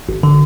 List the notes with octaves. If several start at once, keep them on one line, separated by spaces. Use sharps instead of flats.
G#1
D3